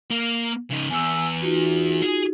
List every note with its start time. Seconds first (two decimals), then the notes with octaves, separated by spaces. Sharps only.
0.11 A#3
0.70 C#3 D#4
0.90 E2 G#5 E6
1.42 D#4 F4 F#4
2.02 G#4